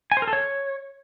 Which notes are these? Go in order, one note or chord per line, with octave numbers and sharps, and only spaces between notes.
G#5
C5
A#4
A4
C#5